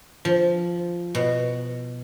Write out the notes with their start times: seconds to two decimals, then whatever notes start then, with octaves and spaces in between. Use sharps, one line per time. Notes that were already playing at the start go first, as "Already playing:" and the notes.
0.25 F3
1.15 B2